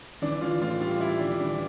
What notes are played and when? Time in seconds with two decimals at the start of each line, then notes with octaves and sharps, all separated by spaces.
0.22 E3 D4
0.41 E3 F4
0.61 A2 F4
0.81 G3 F4
1.00 G3 E4
1.20 E3 D4
1.40 E3 D4